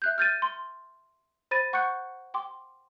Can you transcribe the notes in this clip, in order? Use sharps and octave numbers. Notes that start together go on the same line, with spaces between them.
E5 F#6 G6
F6 G6 A6 D#7
C6
C5 B5 A6 A#6 D#7
F#5 C#6 F#6 G6 C#7
G5 C6 D6